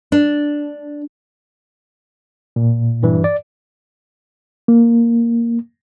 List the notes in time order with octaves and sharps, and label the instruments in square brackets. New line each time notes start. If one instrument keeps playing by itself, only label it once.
[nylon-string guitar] D4
[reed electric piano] A#2
[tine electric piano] G2 E3
D5
[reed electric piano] A#3